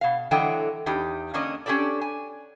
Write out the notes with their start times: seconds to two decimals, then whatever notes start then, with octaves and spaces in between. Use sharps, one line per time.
0.01 B2 F5
0.31 D3 E3 F#3 A3 D#5 G5
0.86 E2 D#4 G4
1.34 D3 A#3 C#4 D4 C#5 D#5
1.66 C#4 D4 G4 A4 D5
2.01 G#5